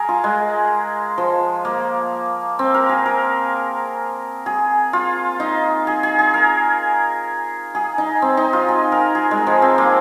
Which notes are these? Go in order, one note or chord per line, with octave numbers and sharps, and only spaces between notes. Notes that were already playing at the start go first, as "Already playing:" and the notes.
Already playing: G#4 A#4
F4
G#3
F3
A#3
C4
A#4
G#4
A#4
G#4
F4
D#4
G#4
G#4
G#4
A#4
G#4
D#4
C4
D#4
F4
G#4
A#4
G#4
G#3
F3
C4
A#3